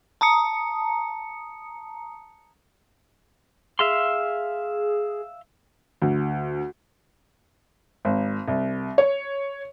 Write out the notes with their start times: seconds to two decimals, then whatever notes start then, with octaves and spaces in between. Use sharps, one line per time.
0.21 A5 A#5 D#6 C#7
3.79 G#4 E5 F5 C6
6.02 D2
8.05 G#1
8.48 C2
8.98 C#5